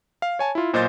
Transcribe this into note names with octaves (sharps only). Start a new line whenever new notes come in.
F5
C#5 G#5 A5
E4 F4
B1 A#2 C5 D#5 G6 A6